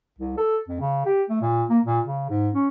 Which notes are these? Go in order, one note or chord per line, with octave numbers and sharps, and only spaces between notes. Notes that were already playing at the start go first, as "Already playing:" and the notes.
C2
A4
F2
C#3
G4
A3
A#2
A#3
A#2
C#3
G#2
C#4